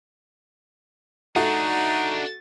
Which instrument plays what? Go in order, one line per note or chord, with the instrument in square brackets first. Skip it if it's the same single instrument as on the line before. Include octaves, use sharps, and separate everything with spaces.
[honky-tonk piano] A3 F#4 [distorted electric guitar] D4 G#4 [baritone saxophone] D#4